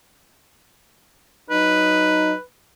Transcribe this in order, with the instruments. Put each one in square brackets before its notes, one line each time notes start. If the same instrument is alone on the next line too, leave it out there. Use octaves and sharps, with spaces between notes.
[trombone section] F#3 D#4 [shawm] B4